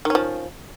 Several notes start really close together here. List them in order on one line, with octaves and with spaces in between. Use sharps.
D#3 C#4 F3